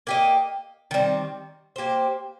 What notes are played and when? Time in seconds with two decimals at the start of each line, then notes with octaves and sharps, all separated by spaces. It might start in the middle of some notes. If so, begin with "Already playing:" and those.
0.07 A#3 G4 D#5
0.91 D#3 G3 C4
1.76 A#3 G4 C5